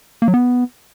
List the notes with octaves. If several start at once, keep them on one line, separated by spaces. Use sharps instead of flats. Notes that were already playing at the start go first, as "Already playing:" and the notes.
A#3
F#3
B3